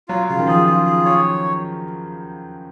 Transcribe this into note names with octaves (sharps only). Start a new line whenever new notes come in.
F#3 F4
C#3 F4
D#3
F3 G#4
F4
G#4
C#5